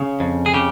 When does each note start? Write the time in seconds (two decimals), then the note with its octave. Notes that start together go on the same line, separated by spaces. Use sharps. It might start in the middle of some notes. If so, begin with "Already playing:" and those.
Already playing: C#3
0.20 F2
0.46 G#4
0.54 C#3 G4